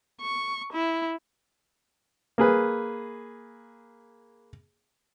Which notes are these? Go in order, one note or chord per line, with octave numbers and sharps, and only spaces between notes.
C#6
E4
A#3 G#4 B4